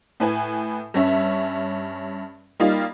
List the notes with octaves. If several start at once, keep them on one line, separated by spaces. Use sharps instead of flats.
A2 B4 G#5
G2 C#4 E5
G3 A#3 D#4 F4